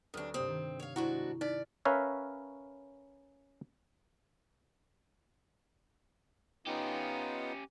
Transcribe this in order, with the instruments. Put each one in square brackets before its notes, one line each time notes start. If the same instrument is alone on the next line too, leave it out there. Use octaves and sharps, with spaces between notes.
[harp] D2 F#3 A3 [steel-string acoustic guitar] C3 D4 [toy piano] A4 B4
[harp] G2 C3 [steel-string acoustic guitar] C4 [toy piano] D#6
[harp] D#3
[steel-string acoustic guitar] C#5 F5
[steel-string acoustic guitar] G#2 D4 F#4 [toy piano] E4 C#6
[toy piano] D#4 [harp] B4 F6 B6 [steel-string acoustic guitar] D5
[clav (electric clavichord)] C#4 A#4 B4 C#5 E5 F5
[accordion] B3 D#4 F4 [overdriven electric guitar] C#4 G4